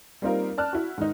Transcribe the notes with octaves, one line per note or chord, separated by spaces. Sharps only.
G3 A#3 C4 D#4 F4 A#4
D5 A5 F6 F#6
E4 F#4
G#2 D#3 D#4